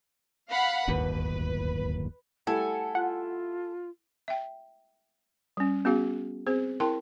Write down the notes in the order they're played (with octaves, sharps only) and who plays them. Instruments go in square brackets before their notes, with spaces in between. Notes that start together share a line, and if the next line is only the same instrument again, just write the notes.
[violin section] F5 F#5 B5
[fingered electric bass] D1 G1 D#2 [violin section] B4
[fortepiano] G3 A3 E4 [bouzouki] A4 G#5 [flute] F#5
[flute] F4 [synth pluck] F#5
[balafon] E5 G5
G3 C#4
B3 C#4 F#4 G#4 F5
C4 G#4 C5
E4 A#4 G5 A5 C6